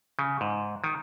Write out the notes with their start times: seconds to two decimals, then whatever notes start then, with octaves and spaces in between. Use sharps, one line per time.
0.19 C#3
0.41 G#2
0.84 D#3